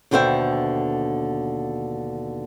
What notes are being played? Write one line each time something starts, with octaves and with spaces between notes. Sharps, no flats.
D#2 B2 D3 C5 E5 G5